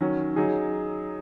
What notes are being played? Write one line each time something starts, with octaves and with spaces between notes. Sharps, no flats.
D#3 F#3 C#4
F#3 D#4 G#4